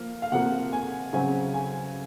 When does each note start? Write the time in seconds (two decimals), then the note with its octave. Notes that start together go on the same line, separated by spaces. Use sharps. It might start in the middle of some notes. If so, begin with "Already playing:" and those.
Already playing: F3 A#3 F5
0.22 F5
0.32 C3 F3 A#3 F#5
0.73 G#5
1.13 C#3 F#3 C4 G#5
1.54 G#5